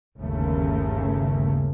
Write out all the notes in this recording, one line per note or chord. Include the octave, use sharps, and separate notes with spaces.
G1 D#2 C#3 A3 A#3